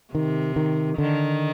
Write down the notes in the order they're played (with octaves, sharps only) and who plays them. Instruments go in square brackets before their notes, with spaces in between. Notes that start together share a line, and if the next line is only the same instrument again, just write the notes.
[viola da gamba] C3 [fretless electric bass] D#3
[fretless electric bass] D#3
[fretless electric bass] D3 [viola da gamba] D#3